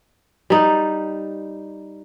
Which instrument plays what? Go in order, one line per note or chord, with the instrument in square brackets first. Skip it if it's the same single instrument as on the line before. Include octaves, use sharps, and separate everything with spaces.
[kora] G3 D#4